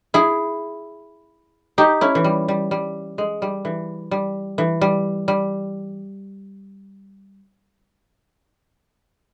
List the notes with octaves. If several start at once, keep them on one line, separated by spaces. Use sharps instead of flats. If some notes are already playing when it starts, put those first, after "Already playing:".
E4 G#4
D#4 G4
C#4 E4
E3
G3
G3
G3
G#3
G3
E3
G3
E3
G3
G3